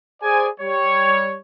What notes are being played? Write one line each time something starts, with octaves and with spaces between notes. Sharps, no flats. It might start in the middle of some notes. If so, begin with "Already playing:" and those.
G#4 C5 D5 G#5
G3 C#5